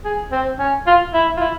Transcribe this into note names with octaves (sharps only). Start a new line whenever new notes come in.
G#4
C4
C#4
F4
E4
F4
E4